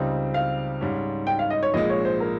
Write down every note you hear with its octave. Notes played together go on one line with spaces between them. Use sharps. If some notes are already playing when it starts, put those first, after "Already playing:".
Already playing: C#2 C#3 G3 C4 D#4
F5
G#2 G3 C#4
G5
F5
D#5
C#5
A#1 A#2 G#3 D#5
C#5
C5
A#4